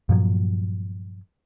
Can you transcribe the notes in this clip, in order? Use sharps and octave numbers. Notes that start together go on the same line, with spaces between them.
G2 A#2 F3 F#3